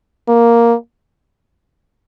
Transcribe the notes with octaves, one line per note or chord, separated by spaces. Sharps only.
A#3